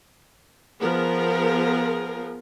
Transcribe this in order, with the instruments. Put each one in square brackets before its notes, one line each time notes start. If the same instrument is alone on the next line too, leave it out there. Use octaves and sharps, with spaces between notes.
[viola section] F3 B3 G#4 A#4